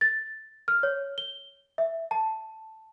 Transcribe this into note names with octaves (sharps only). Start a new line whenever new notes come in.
A6
F6
C#5
G7
E5
A5